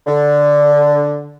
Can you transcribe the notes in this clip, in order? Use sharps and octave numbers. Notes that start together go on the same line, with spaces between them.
D3